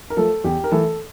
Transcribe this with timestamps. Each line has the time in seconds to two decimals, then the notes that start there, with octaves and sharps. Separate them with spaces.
0.10 A#4
0.17 F3 A3 A4
0.44 E2 G4
0.64 A#4
0.72 E3 A3 A4